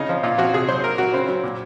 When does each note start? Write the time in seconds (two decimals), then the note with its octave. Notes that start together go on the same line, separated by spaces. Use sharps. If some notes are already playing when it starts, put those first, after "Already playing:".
Already playing: C#3 D#4
0.09 F3
0.23 A#2 F4
0.38 F3 F#4
0.54 C3 G#4
0.68 F#3 C5
0.83 A#2 A#4
0.98 F#3 F#4
1.13 C#3 C4
1.29 F#3
1.43 A#2